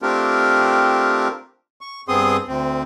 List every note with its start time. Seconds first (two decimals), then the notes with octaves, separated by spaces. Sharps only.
0.02 A3 C4 D4 F4 G4 A#4
1.81 C#6
2.08 G2 B3 C4 G#4 C6 D#6
2.48 D2 C4